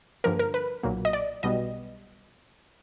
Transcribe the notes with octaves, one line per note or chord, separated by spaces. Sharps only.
G2 D3 F3 A#3 A#4
A#4
B4
B1 A#2 F#3 A#3
D#5
D5
B1 B2 G3 B3 D#5